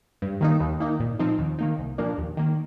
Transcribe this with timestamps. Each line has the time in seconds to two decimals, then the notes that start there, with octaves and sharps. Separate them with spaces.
0.22 G2
0.41 D#3 A#3 D#4
0.60 D#2
0.80 D#3 A#3 D#4
1.00 A#2
1.19 F3 C4 D#4
1.39 D#2
1.59 D#3 A#3 D#4
1.78 C2
1.98 A#2 F3 A#3 D4
2.18 D#2
2.37 D#3 A#3